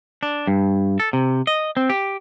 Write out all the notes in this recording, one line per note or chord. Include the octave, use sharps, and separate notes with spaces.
D4
G2
A4
C3
D#5
C4
G4